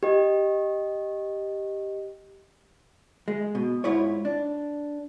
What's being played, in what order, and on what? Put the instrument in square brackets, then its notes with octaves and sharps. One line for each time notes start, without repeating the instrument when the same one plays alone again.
[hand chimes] G4 D#5
[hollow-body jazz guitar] G#3
B2
G#2 E4 F4 C#5
D4